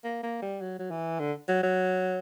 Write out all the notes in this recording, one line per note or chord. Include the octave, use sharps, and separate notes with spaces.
A#3
A#3
G3
F#3
F#3
E3
D3
F#3
F#3